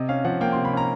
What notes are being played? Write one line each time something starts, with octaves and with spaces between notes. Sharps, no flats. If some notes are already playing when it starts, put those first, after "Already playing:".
Already playing: C3 D#5
C#4 F5
F3 F#5
A#3 G5
C3 C6
B5
C#4 A#5